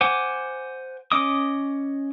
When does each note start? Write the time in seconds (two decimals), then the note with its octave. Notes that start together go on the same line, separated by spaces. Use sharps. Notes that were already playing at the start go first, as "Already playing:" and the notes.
0.01 C5 F#5 G#5 D6
1.12 C#4 D#5 D6 D#6